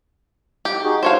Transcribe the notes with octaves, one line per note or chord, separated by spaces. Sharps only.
G4
D#4 F#4 G#4
D4 F#4 C5 C#5 F5